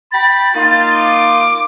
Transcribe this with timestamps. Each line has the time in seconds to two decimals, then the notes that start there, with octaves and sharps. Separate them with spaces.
0.12 G5 B5 A6
0.54 A#3 D#4 F4
0.95 D6